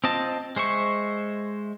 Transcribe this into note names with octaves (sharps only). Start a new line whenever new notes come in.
C4 F4 D#5 A5
G#3 C5 E5 C#6